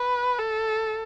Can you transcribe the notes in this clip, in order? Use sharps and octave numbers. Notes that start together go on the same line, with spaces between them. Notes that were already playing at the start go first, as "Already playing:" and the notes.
Already playing: B4
A4